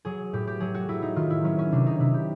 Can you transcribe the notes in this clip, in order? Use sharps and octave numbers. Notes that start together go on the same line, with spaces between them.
F#3 G#4
A2 G4
G4
F#3 G#4
F#4
F#3 E4
D#4
D#3 F4
E4
F#3 C#4
C#4
C3 D4
D#4
C3 E4
G4